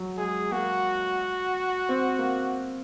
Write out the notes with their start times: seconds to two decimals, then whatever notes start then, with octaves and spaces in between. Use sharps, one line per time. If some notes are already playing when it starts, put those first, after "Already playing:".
Already playing: F#3
0.17 G#3 G#4
0.52 A#3 F#4
1.89 C4
2.19 A#3